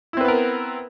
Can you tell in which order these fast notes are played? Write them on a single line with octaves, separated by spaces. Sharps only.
E4 C4 B4 B3 A#4